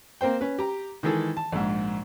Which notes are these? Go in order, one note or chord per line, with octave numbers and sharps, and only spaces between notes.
A#3 C4 C5 G5
C#4 B4
G4 A#5
D#3 E3 G#3 G#4 A4
A5
A#1 G#2